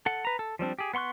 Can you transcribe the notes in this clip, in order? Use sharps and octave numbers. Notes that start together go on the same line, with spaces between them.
A4 F#5
B4 A#5
A4
F3 G3 C4 D4
G4 G#4
B3 F#5 C6 C#6 F#6